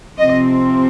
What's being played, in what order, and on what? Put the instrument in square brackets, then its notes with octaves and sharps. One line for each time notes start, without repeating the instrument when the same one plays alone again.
[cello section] C3 F3 C4 D#5